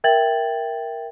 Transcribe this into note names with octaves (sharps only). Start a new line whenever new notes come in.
A#4 E5 G5 G#6 A6 F#7